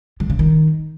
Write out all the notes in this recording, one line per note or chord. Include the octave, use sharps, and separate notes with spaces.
D3
C#3
D#3